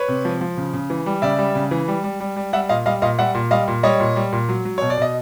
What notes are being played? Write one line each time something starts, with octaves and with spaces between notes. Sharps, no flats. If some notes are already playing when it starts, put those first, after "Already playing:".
Already playing: B4 C#5
C3
F3
F3
C#3
C#3
E3
G3
C#3 D5 E5
G3
C#3
E3
G3
G3
G3
G3
G3 E5 F#5
A#2 D#5 F5
G3 D#5 F5
A#2 D#5 F5
G3 E5 F#5
A#2
G3 D#5 F5
A#2
G3 C#5 D#5
A#2
G3
A#2
F#3
F#3
B2 C#5
D5
B2 D#5